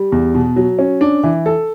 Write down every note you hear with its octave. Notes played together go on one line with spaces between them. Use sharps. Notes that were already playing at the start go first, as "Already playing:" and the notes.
Already playing: G3
E2
B2
F#3
C#4
D4
E3
A4